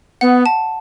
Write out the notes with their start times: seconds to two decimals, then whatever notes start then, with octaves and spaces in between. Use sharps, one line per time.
0.21 B3 F#5
0.46 A5